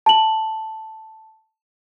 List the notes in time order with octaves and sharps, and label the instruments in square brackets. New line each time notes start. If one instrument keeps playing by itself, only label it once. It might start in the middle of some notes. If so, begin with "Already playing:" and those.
[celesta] A5 F#7